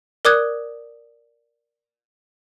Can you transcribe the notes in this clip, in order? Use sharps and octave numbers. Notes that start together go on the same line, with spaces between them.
A#4 D5 D6 D#6 F#6 G#6